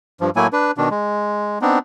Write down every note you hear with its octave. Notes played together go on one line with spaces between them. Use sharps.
G2 F3
A2 F#3 A3 A#3 E4 G#5
D4 B4
B2 D#3 D4
G#3
B3 C4 D4 D#4